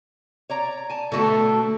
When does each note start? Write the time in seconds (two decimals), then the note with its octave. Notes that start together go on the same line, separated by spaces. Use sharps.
0.50 C#5 D5 A#5
0.90 G#5 A5
1.12 B2 D3 A3 F#4 A5